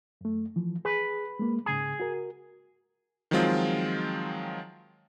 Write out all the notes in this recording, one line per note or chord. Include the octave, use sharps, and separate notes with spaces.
F#2 A3
E3 F3
G#4 B4
G#3 A#3
G#2 C#3 G#4 D#6
F#4 A#4
D#3 F3 F#3 G#3 C4 F4